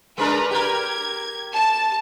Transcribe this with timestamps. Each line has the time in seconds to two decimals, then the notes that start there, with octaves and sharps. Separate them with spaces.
0.18 G#3 D4 A#4 B4 A#5
0.51 G4 A#4 G#6
1.53 A5